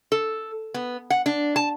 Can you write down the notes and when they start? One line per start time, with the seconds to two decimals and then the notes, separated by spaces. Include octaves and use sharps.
0.12 A4
0.74 B3
1.10 F#5
1.26 D4
1.56 A5